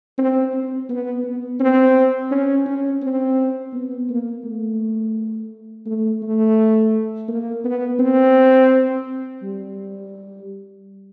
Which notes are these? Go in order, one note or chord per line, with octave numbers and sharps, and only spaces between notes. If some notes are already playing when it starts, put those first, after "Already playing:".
C4
C4
B3
B3
C4
C#4
C#4
C4
B3
A#3
A3
A3
A3
A#3
B3
C4
G3